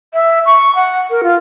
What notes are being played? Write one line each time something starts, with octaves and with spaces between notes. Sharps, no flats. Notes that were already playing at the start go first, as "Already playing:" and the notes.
E5
C#6
F#5
A#4
F4